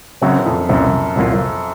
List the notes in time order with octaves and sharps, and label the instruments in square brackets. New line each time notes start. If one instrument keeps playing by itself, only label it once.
[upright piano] F#2 [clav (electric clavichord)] C#3 F#3 C4 F#4
[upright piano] F2
[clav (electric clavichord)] C2 A#2 F3 [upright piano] F#2
[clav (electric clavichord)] C2 A#2 F#3 A#3 F4